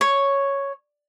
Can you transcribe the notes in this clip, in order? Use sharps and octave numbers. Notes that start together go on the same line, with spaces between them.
C#5